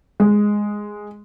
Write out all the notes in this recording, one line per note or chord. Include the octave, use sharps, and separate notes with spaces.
G#3